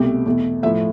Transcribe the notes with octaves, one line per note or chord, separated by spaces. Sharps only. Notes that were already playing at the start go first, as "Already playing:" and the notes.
Already playing: C2 B2 A3 G4
E2 B2 A3
A2 F3 A3 E5